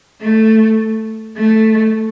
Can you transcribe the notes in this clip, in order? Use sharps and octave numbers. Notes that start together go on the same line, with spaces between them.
A3
A3